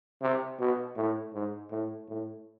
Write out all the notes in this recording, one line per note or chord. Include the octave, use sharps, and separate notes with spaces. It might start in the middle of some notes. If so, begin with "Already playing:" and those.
C3
B2
A2
G#2
A2
A2